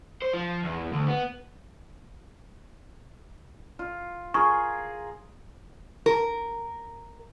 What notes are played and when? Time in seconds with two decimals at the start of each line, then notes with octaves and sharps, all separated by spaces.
0.22 C5
0.33 F3
0.64 E2
0.93 D2
1.08 B3
3.79 F4
4.34 F4 G#4 A#4 C#6
6.06 A#4